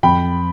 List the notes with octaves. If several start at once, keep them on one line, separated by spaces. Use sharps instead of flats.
F2 G5 B5